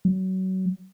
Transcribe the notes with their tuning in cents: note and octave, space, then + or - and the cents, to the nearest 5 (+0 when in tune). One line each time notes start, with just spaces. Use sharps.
F#3 +25